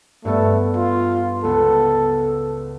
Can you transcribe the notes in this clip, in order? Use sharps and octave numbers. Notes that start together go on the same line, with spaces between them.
G2 A3 B3 A4
F4
C#2 B3 A4